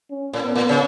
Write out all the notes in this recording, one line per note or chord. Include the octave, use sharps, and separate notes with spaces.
C#4
A2
B3
A2
C#3